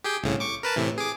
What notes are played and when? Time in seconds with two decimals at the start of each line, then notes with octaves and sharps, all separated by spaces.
0.04 G4 G#4 G5
0.24 C2 A2 C#3
0.40 C#6 D6
0.63 A#4 B4 A5
0.76 A2 C3 E3
0.98 G#4 D6